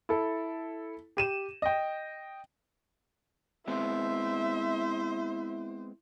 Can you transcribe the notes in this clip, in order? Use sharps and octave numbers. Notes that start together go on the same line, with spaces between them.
E4 A4
G4 D#7 E7
D#5 G5
G#3 B3 C4 E4 C5 E5